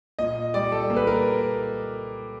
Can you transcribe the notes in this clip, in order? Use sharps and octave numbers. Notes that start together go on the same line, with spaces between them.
A#2 D#5
G3 D5
A4
A#3
B4
A#4